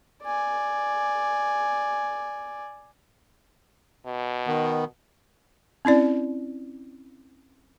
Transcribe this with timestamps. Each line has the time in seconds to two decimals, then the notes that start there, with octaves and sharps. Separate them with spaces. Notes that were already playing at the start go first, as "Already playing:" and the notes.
0.22 D5 G#5
4.06 B2
4.47 D#3 B3
5.85 C4 C#4 E4 D5